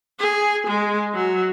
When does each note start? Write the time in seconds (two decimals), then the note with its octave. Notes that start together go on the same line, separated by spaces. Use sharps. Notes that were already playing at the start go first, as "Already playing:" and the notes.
0.19 G#4
0.67 G#3
1.14 F#3